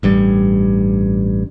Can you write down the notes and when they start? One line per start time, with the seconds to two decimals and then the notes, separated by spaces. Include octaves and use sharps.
0.03 A1 G2 G3